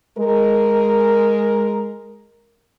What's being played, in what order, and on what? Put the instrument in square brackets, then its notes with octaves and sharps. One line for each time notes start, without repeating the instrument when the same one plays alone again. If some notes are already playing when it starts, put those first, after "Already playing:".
[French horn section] G#3 A#4